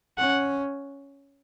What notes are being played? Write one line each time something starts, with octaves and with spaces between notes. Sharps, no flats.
C#4 F#5